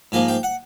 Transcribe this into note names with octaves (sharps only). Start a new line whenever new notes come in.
G#2 F3 A#3 G#5
G5
F#5